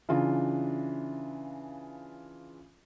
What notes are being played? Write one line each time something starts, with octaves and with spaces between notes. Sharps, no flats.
C#3 E3 D4 F4